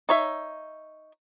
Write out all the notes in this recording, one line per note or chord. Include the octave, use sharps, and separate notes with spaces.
D#4 C#5 E5